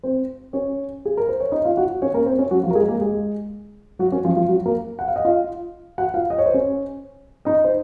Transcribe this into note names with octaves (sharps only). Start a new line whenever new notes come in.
C4 C5
C#4 C#5
G#4
A#4
C5
C#5
D#4 D#5
F4 F5
F#4 F#5
C#4 C#5
A#3 A#4
C4 C5
C#4 C#5
F#3 F#4
F3 F4
A#4
G#3 G#4
A#3 A#4
G#3 G#4
F#3 F#4
C#4
F3 F4
F3 F4
F#3 F#4
A#3 A#4
F#5
F5
D#5
F4 F5
F#4 F#5
F4 F5
D#5
C#5
C5
C#4 C#5
D#4 D#5
C5